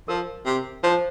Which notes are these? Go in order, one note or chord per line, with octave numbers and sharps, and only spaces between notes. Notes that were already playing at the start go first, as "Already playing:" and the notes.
F3 A#4
C3
F3 C5